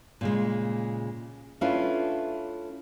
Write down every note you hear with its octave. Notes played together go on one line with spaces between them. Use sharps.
A#2 C#3 G#3
A3 C#4 D4 E4 F4 B4